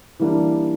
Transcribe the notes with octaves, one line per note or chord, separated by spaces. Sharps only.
E3 G3 A#3 D4